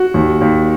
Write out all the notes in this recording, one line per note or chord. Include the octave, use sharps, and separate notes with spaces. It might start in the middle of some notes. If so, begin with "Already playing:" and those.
Already playing: F#4
D#2
D#2